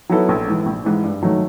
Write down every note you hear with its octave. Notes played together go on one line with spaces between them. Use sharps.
F#3 B3 E4 A4
A#1
G#2 E3
A#1
G#2 E3
G2
D#3 F#3 A3